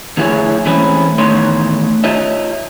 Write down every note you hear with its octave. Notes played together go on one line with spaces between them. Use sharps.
D2 F3 E4 G4 G#4 C#5
E3 G#3 A3 C4 C#4 E4
E2 A2 D#3 A3 C#5 C6
F4 C#5 D#5 E5